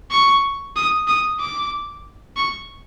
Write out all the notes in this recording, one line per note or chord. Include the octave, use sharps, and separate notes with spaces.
C#6
D#6
D#6
D6
C#6